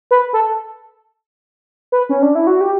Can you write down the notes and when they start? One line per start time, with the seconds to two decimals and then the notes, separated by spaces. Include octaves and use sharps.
0.11 B4
0.33 A4
1.92 B4
2.09 C#4
2.22 D4
2.35 E4
2.47 F#4
2.61 G4